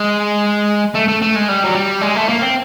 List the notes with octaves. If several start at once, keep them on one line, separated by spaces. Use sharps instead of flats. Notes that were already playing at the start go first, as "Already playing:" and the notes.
Already playing: G#3
A3
A3
A3
G#3
G3
F#3
G3
G#3
A3
A#3
C4